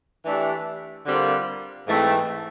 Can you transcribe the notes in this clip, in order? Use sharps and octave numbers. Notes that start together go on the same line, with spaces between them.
E3 A3 D4 G4
D3 G3 C4 F4 A#4
G#2 E3 A3 C4